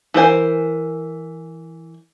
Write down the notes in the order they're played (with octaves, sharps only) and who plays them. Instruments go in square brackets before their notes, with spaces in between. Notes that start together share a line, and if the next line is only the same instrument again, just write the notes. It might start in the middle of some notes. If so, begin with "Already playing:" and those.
[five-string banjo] E3 A#4 C5 G#5